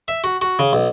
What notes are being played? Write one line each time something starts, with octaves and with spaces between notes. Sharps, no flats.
E5
F#4
F#4
C#3
B1